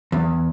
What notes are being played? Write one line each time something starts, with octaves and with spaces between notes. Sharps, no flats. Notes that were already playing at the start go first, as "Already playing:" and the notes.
E2